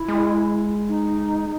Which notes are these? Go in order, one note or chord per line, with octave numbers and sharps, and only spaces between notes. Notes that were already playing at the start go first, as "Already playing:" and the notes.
Already playing: E4
G#3
D#4